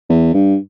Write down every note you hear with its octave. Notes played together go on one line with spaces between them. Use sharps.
E2
G2